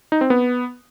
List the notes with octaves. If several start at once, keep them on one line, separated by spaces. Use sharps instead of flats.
D#4
C4
B3